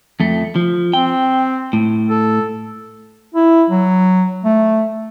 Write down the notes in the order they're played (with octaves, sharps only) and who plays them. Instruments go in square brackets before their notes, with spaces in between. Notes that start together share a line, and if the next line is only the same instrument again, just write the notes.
[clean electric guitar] F2 A3
F3
[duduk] C4 [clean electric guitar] G5
[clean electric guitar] A2
[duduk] A4
[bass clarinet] E4
F#3
A3